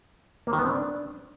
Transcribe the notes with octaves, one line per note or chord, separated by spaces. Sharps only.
A#3
D#3
B3
C4
D4